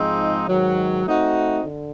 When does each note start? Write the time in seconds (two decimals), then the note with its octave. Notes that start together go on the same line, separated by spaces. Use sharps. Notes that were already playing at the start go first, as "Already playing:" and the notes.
Already playing: G#2 F3 G#3 C4 D#4
0.48 G#2 D#3 F#3
1.04 A3 C4 D#4 F#4
1.63 D3